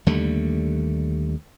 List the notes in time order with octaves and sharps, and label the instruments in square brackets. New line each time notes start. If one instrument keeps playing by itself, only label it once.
[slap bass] D#2 D3 G3 A3